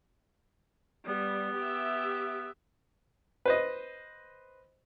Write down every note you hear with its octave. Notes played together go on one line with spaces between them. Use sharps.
G3 B3
G4 E5
B4 C5 D#5